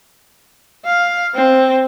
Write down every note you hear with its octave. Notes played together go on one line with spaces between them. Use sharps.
F5
C4